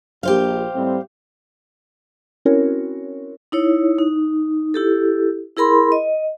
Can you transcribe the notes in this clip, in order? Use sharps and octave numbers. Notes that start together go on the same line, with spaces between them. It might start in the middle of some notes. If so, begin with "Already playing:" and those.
A#1 G4 C5 F5
A2 G3 C4
C4 C#4 E4 F#4 A#4 C#5
D#4 E4 C#5
D#4
E4 G4 A4
E4 G#4 A#4 B5 C6
D#5